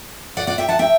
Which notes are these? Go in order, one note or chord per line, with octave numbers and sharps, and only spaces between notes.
D5 F#5
D5 F#5
E5 G5
F#5 A5
E5 G5